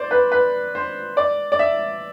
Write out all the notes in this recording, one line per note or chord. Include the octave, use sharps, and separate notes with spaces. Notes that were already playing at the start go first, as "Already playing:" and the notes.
Already playing: C5 D5
B4
B4
C5
D5
D5
E5